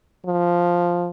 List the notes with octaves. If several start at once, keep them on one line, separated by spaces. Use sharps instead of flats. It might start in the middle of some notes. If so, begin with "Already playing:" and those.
F3